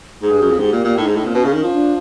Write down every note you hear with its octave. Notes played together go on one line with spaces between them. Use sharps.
G#2 G#4
G2
F#2
F2
G#2 G4
A#2
A#2
A2 D#4
G#2
A2
A#2 C4
B2 C#4
C#3
D#3
F3 C#4
D4